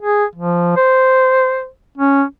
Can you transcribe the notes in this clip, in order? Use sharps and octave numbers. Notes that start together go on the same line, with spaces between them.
G#4
F3
C5
C#4